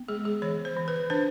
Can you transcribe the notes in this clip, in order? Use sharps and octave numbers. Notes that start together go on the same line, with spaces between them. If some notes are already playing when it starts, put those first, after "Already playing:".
Already playing: B3
G#3 G#4
G#4
E3 C#5
C5
E3
B4
D4 C5